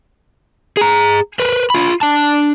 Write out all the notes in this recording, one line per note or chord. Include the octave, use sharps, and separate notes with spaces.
G#4 A#5
A#4 B4
F4 B5
D4 A5